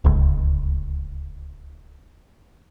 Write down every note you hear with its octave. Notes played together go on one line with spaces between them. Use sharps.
D1 C#2